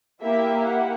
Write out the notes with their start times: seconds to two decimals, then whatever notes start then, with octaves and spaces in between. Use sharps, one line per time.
0.21 A#3 E4 G4 E5
0.66 F#5